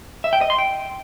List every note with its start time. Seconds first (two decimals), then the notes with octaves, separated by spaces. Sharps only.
0.24 E5
0.33 G5
0.41 D#5
0.50 C6
0.58 G5